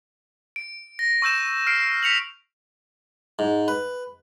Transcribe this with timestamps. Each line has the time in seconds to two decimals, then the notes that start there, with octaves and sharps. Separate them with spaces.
0.56 D7
0.99 A#6
1.22 C#6 E6 G6 E7
1.66 F6 C7 D7
2.03 B6 C#7 F7 F#7
3.39 G#2
3.68 B4